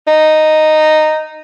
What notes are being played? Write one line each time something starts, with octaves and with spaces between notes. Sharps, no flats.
D#4